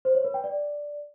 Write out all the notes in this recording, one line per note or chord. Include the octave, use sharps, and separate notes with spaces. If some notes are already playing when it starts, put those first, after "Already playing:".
C5
C#5
B4
G5
D5